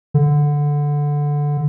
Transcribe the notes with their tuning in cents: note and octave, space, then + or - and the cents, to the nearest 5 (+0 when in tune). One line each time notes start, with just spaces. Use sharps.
D3 -5